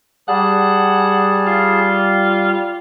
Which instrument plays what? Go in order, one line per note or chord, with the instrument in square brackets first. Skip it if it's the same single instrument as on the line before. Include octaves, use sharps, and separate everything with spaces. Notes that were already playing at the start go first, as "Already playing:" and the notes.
[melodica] G3 [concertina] G#4 A5 [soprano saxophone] F#5
[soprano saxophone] F4